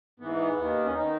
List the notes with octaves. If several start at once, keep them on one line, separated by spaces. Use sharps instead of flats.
G#2 E3 B3
B3
D#2 D#3
C#4
D#3 D#4